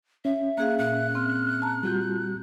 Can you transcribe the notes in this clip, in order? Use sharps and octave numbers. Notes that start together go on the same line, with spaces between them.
C#4 E5
A#3 G#4 F5 F#6
A#2 F#6
C4 F6
A5 A#5
G3 F4 F#4 G6